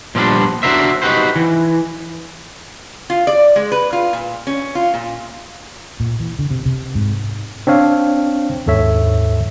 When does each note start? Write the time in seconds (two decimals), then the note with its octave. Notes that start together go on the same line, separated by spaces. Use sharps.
0.15 A#2 F3 G3 B3 D4
0.63 D4 F#4 A#4 C5 E5
1.02 D#4 F#4 G4 B4 C5
1.36 E3
3.10 F4
3.27 D5
3.56 G#3
3.72 B4
3.93 F4
4.13 A#2
4.47 C#4
4.75 F4
4.94 A#2
6.00 A#2
6.20 E3
6.39 D3
6.51 C3
6.66 C3
6.95 G#2
7.67 C4 D4 C#5 F5
8.66 D#2 G#2 A4 C#5 E5